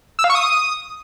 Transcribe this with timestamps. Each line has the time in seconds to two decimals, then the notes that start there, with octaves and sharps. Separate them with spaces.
0.19 E6
0.24 F5
0.30 C#6
0.35 D#6